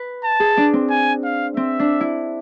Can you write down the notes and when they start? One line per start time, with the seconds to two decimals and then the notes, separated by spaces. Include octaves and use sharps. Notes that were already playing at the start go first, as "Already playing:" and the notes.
Already playing: B4
0.24 A5
0.40 G#4
0.57 D4
0.73 C4
0.90 G#5
1.24 F5
1.56 C4 E5
1.80 D4
2.01 E4